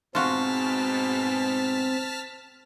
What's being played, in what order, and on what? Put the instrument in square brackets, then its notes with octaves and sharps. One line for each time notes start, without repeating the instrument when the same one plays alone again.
[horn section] G#2 B2 [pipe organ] C4 [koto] F4 F#4 [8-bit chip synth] A5 F6 B6